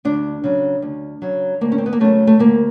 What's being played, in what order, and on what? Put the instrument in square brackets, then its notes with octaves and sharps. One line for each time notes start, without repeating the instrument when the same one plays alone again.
[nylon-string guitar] D2 D4
C#3 F#3
D2
C#3 F#3
D2 A#3
C#4
C4
B3
A#3
C#3 F#3 A3
A3
D2 A#3